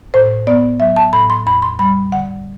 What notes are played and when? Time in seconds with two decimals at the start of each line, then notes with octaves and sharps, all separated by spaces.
0.14 A2 C5
0.47 B3 D5
0.80 F#3 E5
0.96 A5
1.13 A2 B5
1.30 C6
1.46 E2 B5
1.62 C6
1.79 G3 B5
2.12 D3 F#5